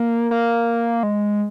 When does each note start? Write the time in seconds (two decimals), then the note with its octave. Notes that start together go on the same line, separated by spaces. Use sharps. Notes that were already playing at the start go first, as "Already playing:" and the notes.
Already playing: A#3
0.31 A#3
1.03 G#3